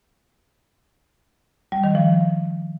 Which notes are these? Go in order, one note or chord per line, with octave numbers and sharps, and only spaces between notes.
G3
D#3
F3